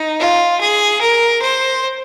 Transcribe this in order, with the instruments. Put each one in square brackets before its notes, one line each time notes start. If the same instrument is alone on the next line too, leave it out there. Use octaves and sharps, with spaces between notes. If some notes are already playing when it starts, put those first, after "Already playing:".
Already playing: [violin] D#4
F4
G#4
A#4
C5